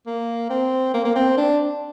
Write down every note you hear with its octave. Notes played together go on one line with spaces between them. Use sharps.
A#3
C4
A#3
A#3
C4
D4